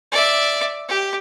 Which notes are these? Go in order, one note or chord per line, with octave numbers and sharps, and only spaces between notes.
D5 E5
G4